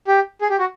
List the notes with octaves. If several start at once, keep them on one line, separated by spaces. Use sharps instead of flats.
G4
G#4
G4
F#4